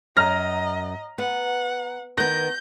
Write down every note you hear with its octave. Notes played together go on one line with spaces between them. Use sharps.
F#2 D#5 A#5 F6 A#6
B3 F#5
D#3 B3 G6 A#6